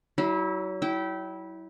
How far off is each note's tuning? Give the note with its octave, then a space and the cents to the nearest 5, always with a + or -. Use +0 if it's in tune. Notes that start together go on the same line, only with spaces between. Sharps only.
F#3 +30 E4 -25
E4 -20 G5 -25